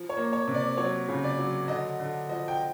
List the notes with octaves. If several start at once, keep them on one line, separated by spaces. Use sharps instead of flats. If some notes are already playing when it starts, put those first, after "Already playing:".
Already playing: F3
C#5
A#3
C#5
C3
D5
F#3 C#5
C#3
D5
F#3
D3 D#5
D3
F3 D#5
G5